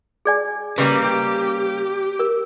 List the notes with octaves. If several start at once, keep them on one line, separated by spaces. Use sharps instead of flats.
G#4 D5 G#5
C#3 G3 A#3 B4
G4
A#4